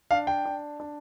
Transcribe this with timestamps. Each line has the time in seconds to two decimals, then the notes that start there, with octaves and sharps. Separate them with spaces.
0.11 D4 F5
0.27 G5
0.45 D4
0.80 D4